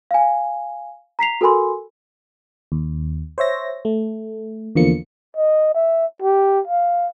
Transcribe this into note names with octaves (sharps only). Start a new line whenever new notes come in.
F5 G#5
A#5 B6 C7 F7
F#4 A4 A#4 G#5 B5 C6
D#2
C5 C#5 E5 A#6
A3
E2 D3 F3 A#3 C#7
D#5
E5
G4
F5